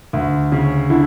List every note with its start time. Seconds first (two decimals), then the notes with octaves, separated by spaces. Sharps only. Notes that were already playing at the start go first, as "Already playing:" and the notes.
0.13 D2
0.52 C#3
0.90 D3 E4